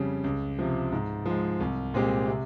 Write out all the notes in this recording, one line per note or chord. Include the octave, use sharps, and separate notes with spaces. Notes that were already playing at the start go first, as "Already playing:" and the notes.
Already playing: F2 C#3 G3
C#2
C3 F3
G#2
F3 G#3
C2
A#2 G#3 C4 G4
C3